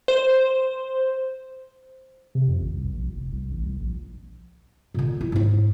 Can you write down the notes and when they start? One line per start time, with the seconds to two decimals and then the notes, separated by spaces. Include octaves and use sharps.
0.08 C5
2.35 C3
2.48 F2
2.60 A1
2.74 C2
2.94 A#1
3.14 F1
3.32 C2
3.52 A1
3.66 C2
3.80 A#1
4.94 A#2 D3
5.21 E4
5.32 G#2 E4